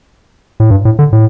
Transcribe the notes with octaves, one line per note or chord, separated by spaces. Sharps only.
A2
G2
A2
D3
A2